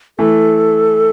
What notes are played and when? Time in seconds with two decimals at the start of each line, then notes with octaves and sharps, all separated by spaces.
0.19 E3 A3 A4